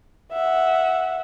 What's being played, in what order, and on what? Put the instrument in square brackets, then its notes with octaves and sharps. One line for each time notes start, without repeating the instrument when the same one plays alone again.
[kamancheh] E5 F#5